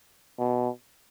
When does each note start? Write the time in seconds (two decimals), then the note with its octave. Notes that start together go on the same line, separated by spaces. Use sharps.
0.39 B2